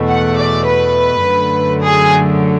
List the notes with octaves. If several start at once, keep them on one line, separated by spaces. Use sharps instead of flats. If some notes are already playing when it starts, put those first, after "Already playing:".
Already playing: E2 B2 A3
F#5
D5
B4
F#2 D3 F#3 A3
G#4